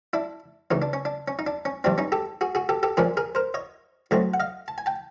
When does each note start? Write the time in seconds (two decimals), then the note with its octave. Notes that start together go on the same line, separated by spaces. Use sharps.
0.13 D4 E4
0.71 C#2 C#3 E3 D#4
0.82 D4
0.93 C#4
1.05 D4
1.28 C#4
1.39 D#4
1.47 D4
1.65 C#4
1.84 G2 E3 G3 C4 D4
1.98 C#4 D#4
2.12 G4 A4
2.41 F#4 G#4
2.55 F#4 G#4
2.69 G4 A4
2.83 G4 A4
2.97 A#1 A#2 F3 G#3 C#4 G#4 A#4
3.17 G#4 A#4
3.35 A#4 C5
3.54 C#5 D#5
4.11 A2 F#3 A3 C4 C#5 D#5
4.34 F#5
4.40 D#5 F5
4.68 A5
4.78 G#5
4.86 G5 A5